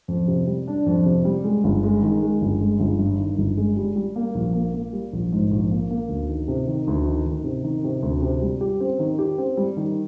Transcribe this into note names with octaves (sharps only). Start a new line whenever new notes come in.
F2
C3
G3
D4
F2
C3
G3
G#3
G1
G#3
D#3
G#3
G1
G#3
G1
G2
D#3
G1
G#3
G3
G3
A#3
A#1
A#3
A#3
G3
A#1
G#2
A#1
A#3
A#3
D2
D#3
C3
D#3
D2
D#3
D#3
C3
D#3
C3
D2
C3
G3
G4
C4
D#3
G4
C4
G3
D#3